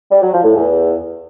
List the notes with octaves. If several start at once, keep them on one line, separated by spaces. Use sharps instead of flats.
G3
F#3
F3
A2
E2